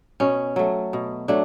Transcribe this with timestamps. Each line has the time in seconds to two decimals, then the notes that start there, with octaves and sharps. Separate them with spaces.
0.20 B2 C#4
0.56 F#3 A3
0.93 B2
1.28 F#3 A3 D4